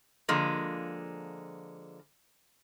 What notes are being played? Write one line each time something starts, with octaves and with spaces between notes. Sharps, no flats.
D3 F3 G#3 A#3